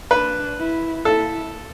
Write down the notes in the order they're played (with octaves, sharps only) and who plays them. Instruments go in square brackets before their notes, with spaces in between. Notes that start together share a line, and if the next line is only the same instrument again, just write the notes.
[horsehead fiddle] D4 [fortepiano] B4
[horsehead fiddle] E4
[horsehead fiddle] E4 [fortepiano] A4